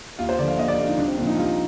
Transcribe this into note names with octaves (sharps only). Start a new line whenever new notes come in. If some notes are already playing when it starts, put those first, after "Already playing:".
D#2 F4
C5
D3 F3 D5
F5
D#2 D#5
D5
D3 F3 F4
D#4
C2 D4
C4
A#2 F3 D4
D#4
C2 F4